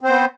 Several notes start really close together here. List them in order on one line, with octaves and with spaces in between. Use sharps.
C4 C5 B3